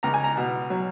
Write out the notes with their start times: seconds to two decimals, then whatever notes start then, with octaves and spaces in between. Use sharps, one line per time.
0.03 C#2 A#5
0.14 G#5
0.24 A#5
0.37 B2
0.70 F#3